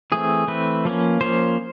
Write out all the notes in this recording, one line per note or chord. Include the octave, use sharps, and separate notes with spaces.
E3 A3 C4 G#4
E3 A3 C4 B4
F3 A#3 C#4
F3 A#3 C#4 C5